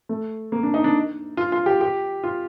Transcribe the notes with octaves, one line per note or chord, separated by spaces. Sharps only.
A3
A#3
D4
D#4
D4
F4
F4
G4
G4
F4